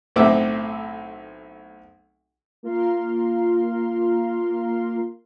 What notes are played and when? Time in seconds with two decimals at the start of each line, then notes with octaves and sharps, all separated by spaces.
0.16 B1 A2 C4 E5 D6
2.63 A#3 F4 A#4 F5 C6